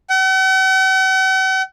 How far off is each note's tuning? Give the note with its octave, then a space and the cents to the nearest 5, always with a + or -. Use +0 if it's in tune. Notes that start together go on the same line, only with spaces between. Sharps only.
F#5 +45